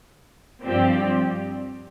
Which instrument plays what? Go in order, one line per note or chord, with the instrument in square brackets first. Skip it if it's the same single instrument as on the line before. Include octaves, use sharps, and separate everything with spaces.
[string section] G2 F3 C4 G4 D5